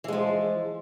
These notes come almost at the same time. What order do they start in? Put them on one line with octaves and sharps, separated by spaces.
E3 G#3 F3